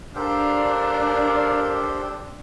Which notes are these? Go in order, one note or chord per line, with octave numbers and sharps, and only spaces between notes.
D4 G4 A4 A#4 C5 F5